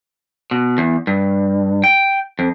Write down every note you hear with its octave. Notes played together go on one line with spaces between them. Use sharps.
B2
E2
G2
G5
F2